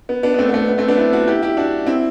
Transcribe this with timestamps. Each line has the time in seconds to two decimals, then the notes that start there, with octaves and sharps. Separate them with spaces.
0.09 B3
0.23 B3 D4
0.34 B3
0.38 A3 C4
0.49 B3
0.54 A3
0.68 B3
0.78 A3 C4
0.88 B3 D4
0.98 C4 E4
1.13 D4 F#4
1.27 E4 G4
1.42 E4 G4
1.57 D4 F#4
1.87 C4 E4